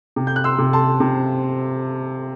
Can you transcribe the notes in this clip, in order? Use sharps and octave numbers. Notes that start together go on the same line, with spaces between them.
C3
G6
F#6
C6 E6
C3
A5 C6
C3